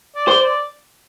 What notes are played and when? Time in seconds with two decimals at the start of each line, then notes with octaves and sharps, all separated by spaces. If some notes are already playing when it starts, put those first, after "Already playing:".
0.15 D5
0.28 C5
0.40 D5